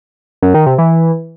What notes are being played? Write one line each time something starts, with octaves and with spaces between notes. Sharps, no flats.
F#2
D#3
C3
E3